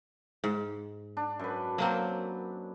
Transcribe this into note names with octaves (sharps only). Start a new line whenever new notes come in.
G#2
D4
F#2 B4
F#3 A#3 C4